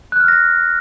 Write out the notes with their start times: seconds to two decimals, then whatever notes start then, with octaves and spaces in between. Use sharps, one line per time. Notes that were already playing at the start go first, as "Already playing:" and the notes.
0.12 F#6
0.20 F6
0.28 A#6